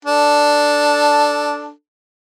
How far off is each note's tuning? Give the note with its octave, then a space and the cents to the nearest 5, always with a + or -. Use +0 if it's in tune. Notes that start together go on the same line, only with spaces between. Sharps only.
D4 +0 A4 +0